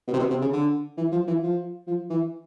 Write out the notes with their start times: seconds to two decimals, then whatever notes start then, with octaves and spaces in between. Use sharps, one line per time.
0.07 B2
0.13 C3
0.19 B2
0.30 C3
0.41 C#3
0.52 D3
0.97 E3
1.12 F3
1.27 E3
1.43 F3
1.87 F3
2.10 E3